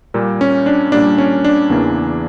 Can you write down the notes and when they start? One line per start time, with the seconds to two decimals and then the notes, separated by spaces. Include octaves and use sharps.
0.14 A#2 G3 A#3
0.41 C#4
0.66 D4
0.92 A#2 G3 A#3 D4
1.18 C#4
1.44 D4
1.70 E2 C#3 E3 A#3